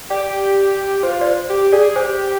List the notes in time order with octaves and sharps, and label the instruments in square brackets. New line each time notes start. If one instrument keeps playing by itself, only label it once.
[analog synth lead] G4 [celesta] D5
[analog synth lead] F4 [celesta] C5
[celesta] D5
C5
[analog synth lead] G4
[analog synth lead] G#4 [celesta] D5
[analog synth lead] G4 [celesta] C5